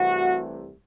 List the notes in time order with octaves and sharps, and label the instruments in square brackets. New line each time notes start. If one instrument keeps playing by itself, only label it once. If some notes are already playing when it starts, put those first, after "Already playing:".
Already playing: [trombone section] C2 C3 E3 A3 F#4